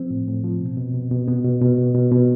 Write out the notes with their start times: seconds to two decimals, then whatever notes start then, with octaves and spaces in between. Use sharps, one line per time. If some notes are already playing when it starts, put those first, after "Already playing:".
Already playing: F3 C4
0.11 A2
0.27 A2
0.44 F3
0.61 B2
0.78 B2
0.94 B2
1.11 B2
1.28 B2 B3
1.44 B2
1.61 B2
1.78 B2
1.95 B2
2.11 B2